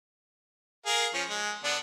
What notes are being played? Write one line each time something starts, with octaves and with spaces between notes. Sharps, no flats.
G#4 A#4 F5
F3 C#4
G#3
D3 B3 D4